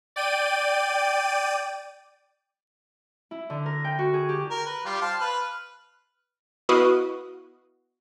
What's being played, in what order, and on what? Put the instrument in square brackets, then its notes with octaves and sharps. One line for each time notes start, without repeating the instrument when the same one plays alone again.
[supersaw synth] D5 G5 D#7
[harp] E4
D3
A#4
G5
F#4
G#4
G4
[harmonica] A#4
B4
G3 F4 G4
C5 F5 A5
B4 F6
[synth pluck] B3 E4 F#4 B4 D#5 F5